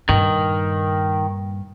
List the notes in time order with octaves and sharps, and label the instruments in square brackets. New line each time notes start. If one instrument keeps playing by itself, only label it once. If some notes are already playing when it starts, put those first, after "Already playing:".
[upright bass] G2 A#2 [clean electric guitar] D#3